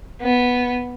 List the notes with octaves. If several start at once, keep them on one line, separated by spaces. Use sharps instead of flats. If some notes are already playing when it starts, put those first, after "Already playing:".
B3